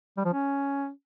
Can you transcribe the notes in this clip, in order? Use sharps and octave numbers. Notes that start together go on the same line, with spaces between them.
G3
F3
C#4